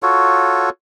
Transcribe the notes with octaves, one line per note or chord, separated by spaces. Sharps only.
F4 F#4 A4 C#5